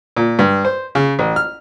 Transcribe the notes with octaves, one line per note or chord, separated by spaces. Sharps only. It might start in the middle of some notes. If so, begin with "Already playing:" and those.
A#2
G2
C5
C#3
A1
F6